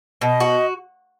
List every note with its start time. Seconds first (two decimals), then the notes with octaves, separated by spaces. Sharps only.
0.21 B2 D#5
0.40 F#4